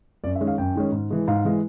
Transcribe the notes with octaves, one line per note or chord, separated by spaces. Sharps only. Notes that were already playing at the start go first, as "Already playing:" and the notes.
F#2 D5
E5
D#3 G#3 C#4
F5
F#2 G5
D#3 G#3 C#4
G#2
E3 G#3
G#2 F5
E3 G#3